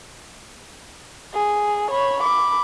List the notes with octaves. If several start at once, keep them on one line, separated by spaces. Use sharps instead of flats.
G#4
C#5 B5
B5 D6